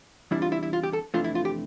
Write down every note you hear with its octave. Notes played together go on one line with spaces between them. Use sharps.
E2 C3 G3 D4 E4
F4
E4
E4
F4
G4
A4
F2 C3 E3 A3 D4 F4
E4
F4
G4